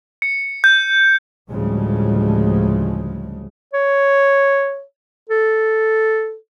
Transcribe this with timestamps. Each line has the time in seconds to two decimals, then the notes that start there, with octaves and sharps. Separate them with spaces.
0.22 C#7
0.64 G6
1.50 D2 A2 C#3 F3 G3 G#3
3.74 C#5
5.30 A4